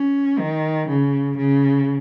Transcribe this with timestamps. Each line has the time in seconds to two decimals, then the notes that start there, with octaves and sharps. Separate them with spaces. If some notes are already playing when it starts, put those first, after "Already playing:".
Already playing: C#4
0.39 D#3
0.89 C#3
1.38 C#3